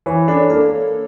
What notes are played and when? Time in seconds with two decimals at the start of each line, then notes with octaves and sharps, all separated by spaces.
0.06 E3 C#5
0.28 D4 A4
0.50 A#3 A4